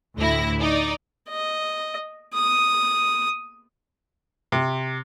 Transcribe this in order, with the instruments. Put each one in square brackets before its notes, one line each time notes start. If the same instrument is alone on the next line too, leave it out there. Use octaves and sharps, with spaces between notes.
[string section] D2 A2 E4 A#6
D#4 D5
[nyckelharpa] D#5
D#6
[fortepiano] C3